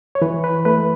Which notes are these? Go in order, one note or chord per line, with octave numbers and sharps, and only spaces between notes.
C#5
E3 B4
B4
A3 B4